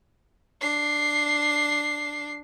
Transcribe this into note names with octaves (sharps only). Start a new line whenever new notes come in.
D4 C7